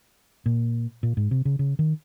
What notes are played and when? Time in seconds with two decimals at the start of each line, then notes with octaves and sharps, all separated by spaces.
0.46 A#2
1.03 A#2
1.17 G#2
1.31 C3
1.45 C#3
1.59 C#3
1.79 D#3